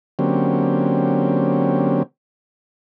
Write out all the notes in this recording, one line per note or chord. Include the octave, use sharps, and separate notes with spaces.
D3 F#3 A#3 C4 C#4 G4